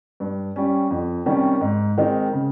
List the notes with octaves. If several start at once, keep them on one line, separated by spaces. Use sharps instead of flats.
G2
G3 C#4
F2
C3 D#3 G3 C#4
G#2
D#3 G#3 C4 D#4
C#3